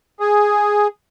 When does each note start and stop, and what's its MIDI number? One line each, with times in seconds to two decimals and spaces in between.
0.20 0.88 68